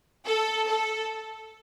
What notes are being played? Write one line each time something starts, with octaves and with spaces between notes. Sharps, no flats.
A4
A4